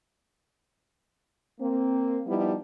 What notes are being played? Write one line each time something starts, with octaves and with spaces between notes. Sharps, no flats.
A#3 C4
F3 G3 B3 D#4 E4